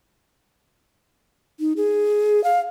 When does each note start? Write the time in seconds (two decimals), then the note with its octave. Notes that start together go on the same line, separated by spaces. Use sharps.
1.60 D#4
1.77 G#4
2.44 F5